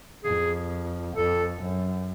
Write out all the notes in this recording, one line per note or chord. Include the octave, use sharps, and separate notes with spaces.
F2 G#4
F2 A4
F#2